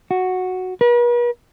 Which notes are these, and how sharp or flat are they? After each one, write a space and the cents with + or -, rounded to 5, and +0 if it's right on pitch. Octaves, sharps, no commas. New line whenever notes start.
F#4 -5
B4 -45